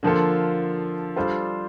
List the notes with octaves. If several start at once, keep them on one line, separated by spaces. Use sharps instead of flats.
D3 F3 A#3 F4 A4
G3 D4 F4 A4 C5